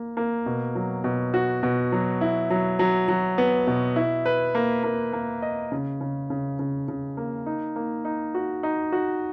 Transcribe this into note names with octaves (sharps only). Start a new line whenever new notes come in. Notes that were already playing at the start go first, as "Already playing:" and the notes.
Already playing: A#3
A#3
B2
F#3
B2
F#4
B2
F#3
E4
F#3
F#3
F#3
B3
B2
E4
B4
A#3
A#3
A#3
D#5
C#3
C#3
C#3
C#3
C#3
A#3
D#4
A#3
D#4
F#4
D#4
F#4